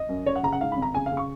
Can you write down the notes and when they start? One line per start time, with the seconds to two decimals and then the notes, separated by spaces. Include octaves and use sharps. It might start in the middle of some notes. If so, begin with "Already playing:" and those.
Already playing: D#5
0.09 F#2
0.26 F#1 C#5
0.36 F#5
0.43 C#3 A#5
0.52 F#5
0.60 G#2 F5
0.72 G#1 B5
0.82 A#5
0.94 C#3 G#5
1.06 F5
1.12 C#3
1.17 C#6